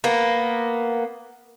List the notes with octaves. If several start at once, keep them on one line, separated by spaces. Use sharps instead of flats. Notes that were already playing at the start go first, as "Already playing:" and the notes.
A#3 B3